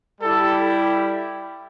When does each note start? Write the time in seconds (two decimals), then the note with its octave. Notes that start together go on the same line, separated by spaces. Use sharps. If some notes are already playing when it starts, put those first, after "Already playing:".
0.21 G3 E4 G4 A4